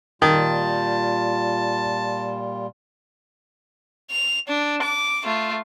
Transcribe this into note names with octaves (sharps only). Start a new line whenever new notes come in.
A#2 D#3 G3 F4 A5
F7
D4
D6
A3 F4